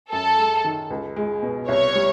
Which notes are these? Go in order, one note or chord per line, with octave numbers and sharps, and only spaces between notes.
F#2 A4
G#3
D#3
C#2
G#3
B2
C2 C#5
G3